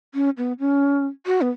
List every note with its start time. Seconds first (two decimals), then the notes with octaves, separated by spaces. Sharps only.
0.14 C#4
0.37 B3
0.59 C#4
1.26 F#4
1.41 B3